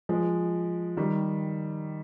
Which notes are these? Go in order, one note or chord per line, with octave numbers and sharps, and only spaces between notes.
F3 G#3
D#3 G3